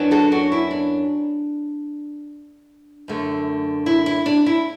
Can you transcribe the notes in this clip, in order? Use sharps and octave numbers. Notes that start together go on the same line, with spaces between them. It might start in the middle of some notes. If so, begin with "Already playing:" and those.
Already playing: F#2 F#3 B3 D4
F#4 A4
D4 F#4
E4
D4
F#2 D3 A3
E4
E4
D4
E4